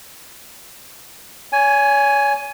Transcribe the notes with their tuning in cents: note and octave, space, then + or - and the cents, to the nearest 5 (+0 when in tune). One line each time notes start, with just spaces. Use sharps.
C#5 +35 G#5 +0